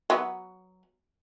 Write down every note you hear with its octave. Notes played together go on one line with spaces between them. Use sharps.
F#3 B3 B4